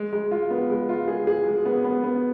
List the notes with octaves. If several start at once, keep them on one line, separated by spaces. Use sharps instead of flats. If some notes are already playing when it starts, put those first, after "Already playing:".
Already playing: G#3
G#3
F4
B3
G#3
F4
G#4
G#4
G#3
B3
B3
B3